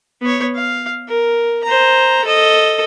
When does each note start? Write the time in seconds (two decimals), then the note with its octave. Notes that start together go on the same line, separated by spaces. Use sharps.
0.21 B3 C#5
0.55 F5
1.08 A#4
1.64 C5 A#5
2.25 A4 D#5